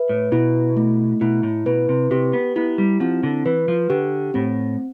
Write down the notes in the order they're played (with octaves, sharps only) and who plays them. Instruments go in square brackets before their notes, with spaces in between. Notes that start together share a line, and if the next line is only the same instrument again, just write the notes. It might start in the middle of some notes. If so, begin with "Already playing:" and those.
Already playing: [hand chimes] B4 E5
[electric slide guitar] A2
[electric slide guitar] B2 [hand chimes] E4
[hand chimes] A3
[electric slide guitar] B2 [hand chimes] E4
[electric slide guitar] A2
[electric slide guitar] B2 [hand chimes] B4
[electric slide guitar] C3
[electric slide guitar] C3 [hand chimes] G4
[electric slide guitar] B3
[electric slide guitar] B3 [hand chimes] E4
[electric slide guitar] G3
[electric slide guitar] F3 [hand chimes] C4
[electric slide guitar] D3
[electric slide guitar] E3 [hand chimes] B4
[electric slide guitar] F3
[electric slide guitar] D3 [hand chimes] G4
[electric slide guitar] A2 [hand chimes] C4